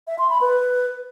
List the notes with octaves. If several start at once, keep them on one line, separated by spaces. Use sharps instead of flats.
E5
C6
B5
B4